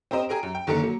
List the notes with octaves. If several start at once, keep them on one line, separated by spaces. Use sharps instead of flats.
C4 G4 A#4 C5 D#5
G4 G#4 A#4 A#5 D7
F#2
G5
F#1 D3 D#3 A#3 A#4 C#7
F#3 A#3